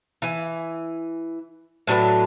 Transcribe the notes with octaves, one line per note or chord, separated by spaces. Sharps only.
E3 G#5
A2 F#3 D4 B4